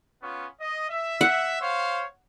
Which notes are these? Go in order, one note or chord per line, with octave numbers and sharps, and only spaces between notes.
B3 C#4 F4
D#5
E5
F#5
C5 C#5 F5